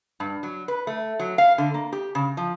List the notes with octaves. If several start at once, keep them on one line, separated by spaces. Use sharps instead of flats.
G2
F#3
B4
A3
F#3
F5
D3
A#3
G4
C#3
F3